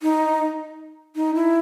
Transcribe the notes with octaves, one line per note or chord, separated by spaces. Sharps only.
D#4
D#4
E4